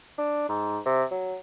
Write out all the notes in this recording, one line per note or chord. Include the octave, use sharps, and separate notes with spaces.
D4
G#2
C3
F#3